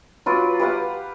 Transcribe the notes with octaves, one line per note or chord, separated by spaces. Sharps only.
F#3 F4 B4 D6
G4 B4 F5 F#5